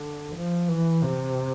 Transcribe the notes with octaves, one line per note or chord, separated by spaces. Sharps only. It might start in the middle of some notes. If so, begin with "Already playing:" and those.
Already playing: D3
F3
E3
C3